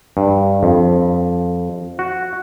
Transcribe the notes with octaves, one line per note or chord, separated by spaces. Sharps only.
G2
F2
F#4